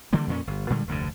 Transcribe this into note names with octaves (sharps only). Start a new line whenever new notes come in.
D3 E3 G3 A#3
F2 A#2 C#4
G1
A#2 D3 G3 G#3
F1 D2 G2 D3